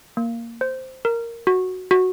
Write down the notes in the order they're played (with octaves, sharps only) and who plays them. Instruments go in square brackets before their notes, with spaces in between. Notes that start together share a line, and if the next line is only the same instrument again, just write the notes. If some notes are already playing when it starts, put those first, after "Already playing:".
[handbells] A#3
C5
A#4
F#4
F#4